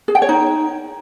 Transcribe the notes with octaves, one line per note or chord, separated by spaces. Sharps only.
G#4
G5
C#5
D#4